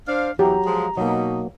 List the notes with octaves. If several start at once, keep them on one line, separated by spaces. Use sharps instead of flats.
D4 C5 F5
E2 E3 F#3 G4 A#5
F3 G#3
B2 F#3 A#3 D#4